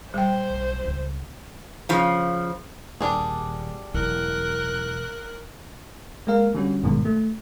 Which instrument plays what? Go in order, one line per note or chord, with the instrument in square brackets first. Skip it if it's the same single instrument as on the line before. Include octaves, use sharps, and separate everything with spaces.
[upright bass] A#2 [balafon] G3 G5 [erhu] C5
[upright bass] B1
C#2 C#3
[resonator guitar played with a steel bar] C#3 F3
[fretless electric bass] D#1 A#3 [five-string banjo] G3 D4 G#4
[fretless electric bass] E1 [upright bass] F#3 E4 [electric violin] A#4 F#6
[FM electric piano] G#3 A#3 A#4 F5
D3 G3 C#4 F#4
G#1 G2 B2 D3 D#3 G#3
A3